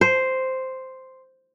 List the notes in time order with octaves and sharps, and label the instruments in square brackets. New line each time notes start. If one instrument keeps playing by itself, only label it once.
[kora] C5